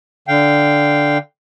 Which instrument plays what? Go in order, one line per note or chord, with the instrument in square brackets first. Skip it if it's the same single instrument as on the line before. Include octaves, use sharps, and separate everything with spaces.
[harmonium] D3 F5 G5